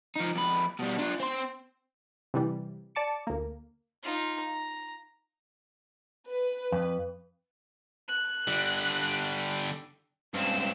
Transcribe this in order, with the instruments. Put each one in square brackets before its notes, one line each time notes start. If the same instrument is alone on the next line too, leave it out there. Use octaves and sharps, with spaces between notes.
[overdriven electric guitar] F3 D#4
F2 B4
B2 G3
D4 F4
C4 C6
[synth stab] C3 E3 G3
D5 A5 D6 C#7
D2 A#3
[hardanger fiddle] D#4 F4
A#5
[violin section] B4
[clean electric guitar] F2
[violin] F#6
[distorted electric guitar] D3 G3
[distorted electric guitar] C#2 G2 [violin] C4 E7